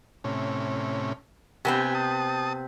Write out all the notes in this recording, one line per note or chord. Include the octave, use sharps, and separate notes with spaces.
A2 C3 C#4
C3 B3 C4 G4 G#5
A5 D#6